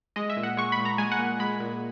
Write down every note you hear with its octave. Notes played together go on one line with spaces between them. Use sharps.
G#3 D#5
E5
A#2
F#5
G#3 C#6
B5
A#2
A#5
G#3 G#5
F#5
A#2
G#3 B5
A#2